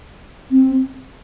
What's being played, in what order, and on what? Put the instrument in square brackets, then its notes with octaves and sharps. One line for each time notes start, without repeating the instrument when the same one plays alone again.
[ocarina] C4